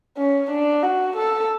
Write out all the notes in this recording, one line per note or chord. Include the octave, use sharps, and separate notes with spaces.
C#4
D4
F#4
A4